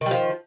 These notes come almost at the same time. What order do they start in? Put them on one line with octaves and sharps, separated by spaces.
D#3 G3 F3